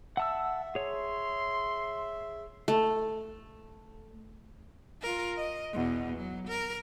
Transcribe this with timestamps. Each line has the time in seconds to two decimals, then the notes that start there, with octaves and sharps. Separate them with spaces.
0.17 E5 F#5 A5 E6
0.75 G#4 C#5 C6
2.68 A3
5.02 F4 A#4
5.37 D#5
5.73 E2 B2
6.17 F#3
6.48 A#4